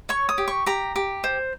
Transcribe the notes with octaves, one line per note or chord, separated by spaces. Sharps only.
C#5 C#6
D#6
G4
C#6
G4 A#5
G4
C5